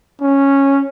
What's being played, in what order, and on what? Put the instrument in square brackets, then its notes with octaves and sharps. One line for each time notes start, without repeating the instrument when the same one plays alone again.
[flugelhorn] C#4